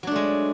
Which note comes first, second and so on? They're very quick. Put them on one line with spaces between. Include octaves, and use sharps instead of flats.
F#3 D4 A3 G#3